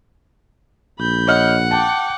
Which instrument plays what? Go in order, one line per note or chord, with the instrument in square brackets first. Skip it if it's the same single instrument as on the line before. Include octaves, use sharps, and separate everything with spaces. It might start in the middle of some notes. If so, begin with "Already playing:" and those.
[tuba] A#1 [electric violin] B5 G6
[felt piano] C#5 D#5 F6 [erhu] F#5
[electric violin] G5 D6 [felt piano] A5